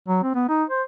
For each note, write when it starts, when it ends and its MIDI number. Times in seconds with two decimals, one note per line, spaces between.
0.08 0.20 54
0.23 0.34 60
0.35 0.46 59
0.49 0.64 63
0.70 0.83 72